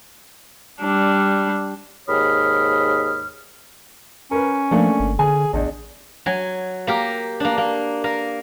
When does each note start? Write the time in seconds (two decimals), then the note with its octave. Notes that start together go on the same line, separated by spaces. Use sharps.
0.82 G3 D4
2.08 D#2 G#2 C#5 B5 D#6 F6
4.31 C#4 A#4 B4
4.71 F3 A3 A#3 D4
5.00 G1
5.19 D3 G#4 G#5
5.53 A1 E2 D4 D#5
6.26 F#3 G#5
6.87 A#3 G4 A#4
7.40 A#3 D4
7.58 A#3
8.04 A#3 A#4